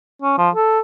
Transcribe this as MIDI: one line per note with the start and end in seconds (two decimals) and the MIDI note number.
0.22 0.37 61
0.38 0.50 53
0.55 0.80 69